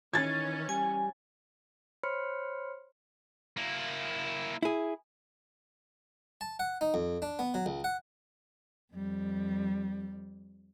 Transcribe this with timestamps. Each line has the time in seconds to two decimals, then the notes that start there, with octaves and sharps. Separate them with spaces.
0.14 D#3 E3 C#4 G#6 A6
0.69 G3 G#5
2.03 C5 C#5 B5 C6 F6 C#7
3.57 A#3 E4
4.63 E4 G#4
6.41 A5
6.59 F#5
6.81 D#4
6.94 F2
7.22 D4
7.39 B3
7.54 F#3
7.66 C#2
7.84 F#5
8.94 F2 G3